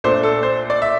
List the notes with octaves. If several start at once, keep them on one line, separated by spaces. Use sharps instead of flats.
A#2 A3 D4 C5
A4
C5
D5
E5